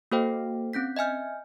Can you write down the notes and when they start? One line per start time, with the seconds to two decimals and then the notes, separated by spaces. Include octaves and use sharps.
0.12 A#3 F#4 A4 C5 F5 G5
0.73 C4 C#4 G6 B6
0.96 D#5 E5 G#5 F6 G6